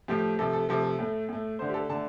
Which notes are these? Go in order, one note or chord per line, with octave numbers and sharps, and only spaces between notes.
A2 F3 A3 G4
C3 F3 A3 A4
A4
C3 F3 A3 A4
A4
A2 A3
A2 A3
D3 A3 C5
G4
A4
D3 A3 A5